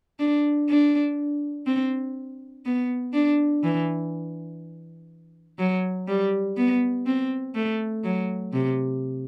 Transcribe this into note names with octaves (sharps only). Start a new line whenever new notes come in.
D4
D4
C4
B3
D4
E3
F#3
G3
B3
C4
A3
F#3
C3